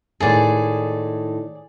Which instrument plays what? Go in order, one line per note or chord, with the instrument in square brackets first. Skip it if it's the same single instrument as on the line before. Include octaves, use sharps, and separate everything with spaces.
[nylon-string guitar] A2 D#3 G#3 [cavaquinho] G#4 D5